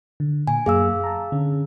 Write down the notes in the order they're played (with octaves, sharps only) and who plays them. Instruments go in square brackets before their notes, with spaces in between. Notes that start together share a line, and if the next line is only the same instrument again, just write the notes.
[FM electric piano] D3
[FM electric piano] A#2 [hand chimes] G#5
[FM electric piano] F#2 A#3 [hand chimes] G#4 F5 E6
[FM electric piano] A5 A#5
D3 C#4